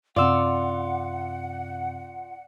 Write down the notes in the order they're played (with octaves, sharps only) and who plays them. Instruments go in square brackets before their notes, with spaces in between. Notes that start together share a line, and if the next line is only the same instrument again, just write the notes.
[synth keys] F#2 C3 C4 [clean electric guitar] F4 [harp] D5 E6 [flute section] F#5